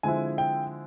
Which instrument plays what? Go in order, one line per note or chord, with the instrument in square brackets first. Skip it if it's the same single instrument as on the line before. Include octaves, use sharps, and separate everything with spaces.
[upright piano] D3 F3 G#3 C4 E4 G#5
G5